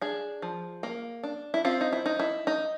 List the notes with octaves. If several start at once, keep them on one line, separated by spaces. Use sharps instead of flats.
D4 G#4
F3
A#3
D4
E4
C4 F4
D#4
E4
D#4
E4
D#4